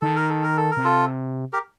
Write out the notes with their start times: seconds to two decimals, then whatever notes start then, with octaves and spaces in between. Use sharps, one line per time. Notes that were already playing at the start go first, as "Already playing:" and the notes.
0.02 D#3 A4
0.16 A#4
0.30 A4
0.43 A#4
0.57 A4
0.71 A#4
0.77 C3
0.84 F4 A4
1.53 G4 A#4